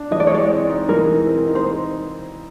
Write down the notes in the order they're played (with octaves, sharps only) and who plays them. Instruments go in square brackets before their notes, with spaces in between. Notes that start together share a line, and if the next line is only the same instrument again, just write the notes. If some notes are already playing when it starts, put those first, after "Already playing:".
Already playing: [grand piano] D4
[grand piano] E3 [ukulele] D#5
[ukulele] D5
C#5
[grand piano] G#3 [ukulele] D5
[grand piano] C4
D#4
[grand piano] E3 [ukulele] A#4
[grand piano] G#3
C4
D#4
[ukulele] C5